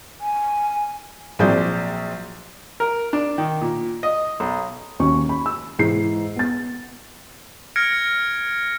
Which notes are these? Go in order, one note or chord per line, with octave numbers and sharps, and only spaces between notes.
G#5
A#1 F#3 C4 G#4 D5 G6
A#4
D4
D#3
A#2
D#5
B1
D#2 C#4 F#4 C#6
B5
E6
G#2 E3 C7
B3 A6
F6 G#6 A#6 C#7 D7